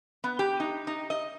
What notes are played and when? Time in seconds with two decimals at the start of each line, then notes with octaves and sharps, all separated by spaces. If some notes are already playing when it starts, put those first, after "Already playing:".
0.24 B3
0.39 G4
0.60 D#4
0.87 D#4
1.10 D#5